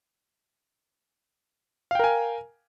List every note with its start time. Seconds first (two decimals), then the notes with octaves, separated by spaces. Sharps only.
1.91 F5
1.95 G5
1.99 A#4
2.04 G#5